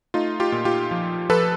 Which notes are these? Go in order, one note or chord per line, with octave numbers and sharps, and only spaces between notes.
A3 D#4 F4
F4 G4
A#2
F4 G4
F3
F3 A4 B4